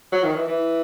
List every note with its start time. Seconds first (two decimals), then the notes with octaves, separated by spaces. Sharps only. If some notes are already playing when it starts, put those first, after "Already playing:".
0.12 F#3
0.24 D#3
0.36 E3
0.47 E3